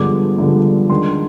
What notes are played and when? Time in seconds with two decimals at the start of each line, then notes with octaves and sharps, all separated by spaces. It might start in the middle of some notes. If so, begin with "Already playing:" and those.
Already playing: G2 D3 F3 G#3 B3 D6
0.38 G2 D3 F3 G#3 B3
0.90 D#3 G#3 D4 C6